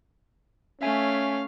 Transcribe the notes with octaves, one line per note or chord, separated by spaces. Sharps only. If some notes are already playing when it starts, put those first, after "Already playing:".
A3 C#4 E5 F5 G#5